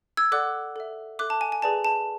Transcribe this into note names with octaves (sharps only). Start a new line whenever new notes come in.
E6 G#6
A4 D5 F#5 D6 F#6
A4 E5
A4 E5 D6 F#6
A5
G#5
G#5
G#4 B4 D5 A5
A5